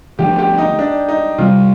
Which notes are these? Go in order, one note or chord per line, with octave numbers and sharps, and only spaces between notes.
D3 F3 A3 D4 G4
G4
D#4
D4
D#4
C3 G3 C4 F4